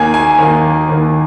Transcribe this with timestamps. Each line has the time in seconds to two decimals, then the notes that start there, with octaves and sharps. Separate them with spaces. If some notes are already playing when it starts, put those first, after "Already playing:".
Already playing: D#2 D#3 A#3 G#5
0.14 G#5
0.38 D#2 D#3 A#3
0.89 D#2 D#3 A#3